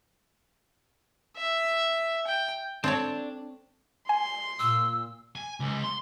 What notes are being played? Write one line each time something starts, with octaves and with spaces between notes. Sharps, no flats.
E5
G5
C4 D4 A4 C#5
G#5 C6
A#2 E6
G#5
C#2
C6